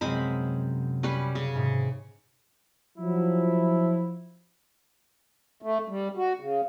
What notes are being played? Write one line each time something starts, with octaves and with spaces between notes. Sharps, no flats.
F#2 C3 F#3 G#3 C4 B5
G3 C#4 B4
C#3
G#2 C3 D#3
F3 F#3 E4
A3
G3
F#4
C#3